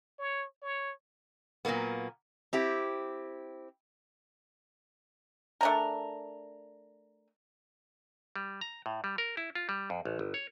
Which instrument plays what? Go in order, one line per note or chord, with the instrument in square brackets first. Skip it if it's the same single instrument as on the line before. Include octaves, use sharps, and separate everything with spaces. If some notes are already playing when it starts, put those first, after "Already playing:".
[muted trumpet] C#5
C#5
[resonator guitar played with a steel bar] A#2 C#3 F#3 A#3 B3
C4 E4 G4
[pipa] A3 D4 A#4
[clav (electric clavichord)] G3
A#5
A2
G3
A#4
E4
F4
G3
F2
A1
G1
C#5